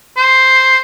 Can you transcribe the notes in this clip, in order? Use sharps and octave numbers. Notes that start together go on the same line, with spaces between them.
C5